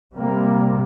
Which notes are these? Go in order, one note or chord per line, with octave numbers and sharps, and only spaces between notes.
C3 G3 A#3